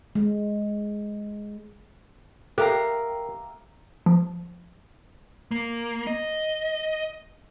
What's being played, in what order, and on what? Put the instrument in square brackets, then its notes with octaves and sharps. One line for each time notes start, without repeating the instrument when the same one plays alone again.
[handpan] G#3
[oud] G4 [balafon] A4 [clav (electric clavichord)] A#4 [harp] E5 F5 A#5
[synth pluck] F3
[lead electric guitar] A#3
D#5